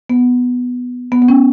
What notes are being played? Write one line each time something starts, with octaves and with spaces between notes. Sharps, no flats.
B3
B3
B3
C#4